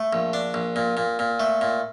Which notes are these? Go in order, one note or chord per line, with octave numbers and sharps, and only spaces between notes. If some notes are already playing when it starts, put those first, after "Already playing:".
Already playing: A3
A#1
D4
A#1
A#2
A#2
A#2
A3
A#2